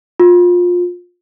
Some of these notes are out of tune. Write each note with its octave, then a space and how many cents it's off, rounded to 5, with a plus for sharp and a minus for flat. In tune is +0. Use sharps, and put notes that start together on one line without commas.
F4 +25